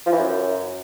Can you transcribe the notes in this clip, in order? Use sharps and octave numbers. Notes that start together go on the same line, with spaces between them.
F3
E3
F#2